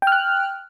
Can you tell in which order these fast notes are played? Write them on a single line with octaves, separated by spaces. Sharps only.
G5 F6 F#6